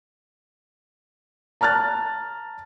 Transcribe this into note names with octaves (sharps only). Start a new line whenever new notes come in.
A5 A#5 F6 F#6 A6